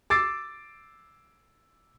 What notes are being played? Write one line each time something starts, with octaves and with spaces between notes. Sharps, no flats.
D6 E6 A6 C7 D7